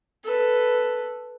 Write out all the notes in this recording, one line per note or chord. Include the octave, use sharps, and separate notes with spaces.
A4 B4